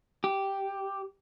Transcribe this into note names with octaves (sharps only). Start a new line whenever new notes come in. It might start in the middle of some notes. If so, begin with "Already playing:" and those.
G4